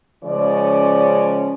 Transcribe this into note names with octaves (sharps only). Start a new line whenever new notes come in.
C#3 F3 G#3 C#4 D5